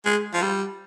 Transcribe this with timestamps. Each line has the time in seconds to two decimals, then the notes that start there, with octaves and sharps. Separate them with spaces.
0.05 G#3
0.34 F3
0.42 G3